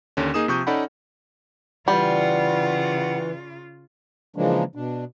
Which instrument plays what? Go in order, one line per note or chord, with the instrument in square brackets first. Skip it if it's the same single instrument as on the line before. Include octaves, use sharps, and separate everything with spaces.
[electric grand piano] D#2 D3 C#4
A#3 D#4 G#4 D#6 E7
C3 F3 C#6 D#6 G6
C#4 D#4 A4 D5 F#5 B5
[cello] C#3 F4 [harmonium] E3 [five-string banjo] G3 [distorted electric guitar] F#5
[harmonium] C#3 E3 F3 G#3 A#3 D4
B2 D4